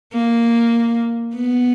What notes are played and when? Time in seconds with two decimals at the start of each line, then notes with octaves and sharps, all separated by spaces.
0.14 A#3
1.36 B3